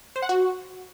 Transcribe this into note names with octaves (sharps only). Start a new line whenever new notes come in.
C5
F#5
F#4